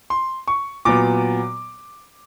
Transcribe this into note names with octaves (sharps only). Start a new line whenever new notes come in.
C6
C#6
A#2 F#3 B3 D6